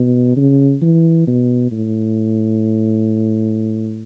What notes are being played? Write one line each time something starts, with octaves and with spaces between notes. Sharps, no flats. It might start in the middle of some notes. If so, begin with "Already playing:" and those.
Already playing: B2
C#3
E3
B2
A2